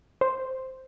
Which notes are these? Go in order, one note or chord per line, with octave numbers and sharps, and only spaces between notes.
C5